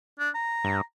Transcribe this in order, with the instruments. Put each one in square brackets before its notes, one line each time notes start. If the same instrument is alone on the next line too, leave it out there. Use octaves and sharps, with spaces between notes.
[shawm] D4
A#5
[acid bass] G2